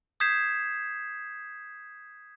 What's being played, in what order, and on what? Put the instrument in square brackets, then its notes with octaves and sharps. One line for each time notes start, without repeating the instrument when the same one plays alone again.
[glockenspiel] D#6 G6 G#6 B6 C7 E7